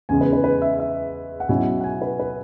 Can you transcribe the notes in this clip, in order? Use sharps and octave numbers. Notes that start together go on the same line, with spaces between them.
E2 C#3 G#3 G#5
B4
B4
B4
E5
E5
F#5
B2 F#3 C#4 E4 G#5
F#5
G#5
B4
B4